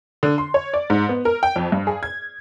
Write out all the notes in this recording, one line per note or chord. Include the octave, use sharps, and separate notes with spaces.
D3
C6
C#5
D5
G#2
B3
A#4
G5
F2
G2
G#4
G#6